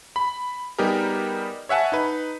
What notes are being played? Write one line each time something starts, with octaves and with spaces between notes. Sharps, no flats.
B5
G3 B3 D#4 G4 G#4 A#4
C#5 E5 F#5 G#5 A5
D#4 B4